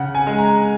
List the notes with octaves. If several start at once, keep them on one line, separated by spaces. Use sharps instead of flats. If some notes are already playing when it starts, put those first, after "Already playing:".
Already playing: C#3 F#5
G#5
G#3
A#5